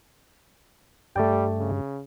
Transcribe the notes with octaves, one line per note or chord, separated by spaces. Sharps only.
G2 G3 A3 D5 G5
C#3